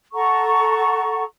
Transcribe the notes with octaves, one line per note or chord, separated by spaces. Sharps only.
A4 F#5 A#5 C#6